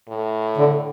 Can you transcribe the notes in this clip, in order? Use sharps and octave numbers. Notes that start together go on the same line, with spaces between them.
A2
D3